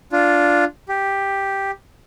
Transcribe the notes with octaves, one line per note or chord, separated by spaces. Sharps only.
D4 F4
G4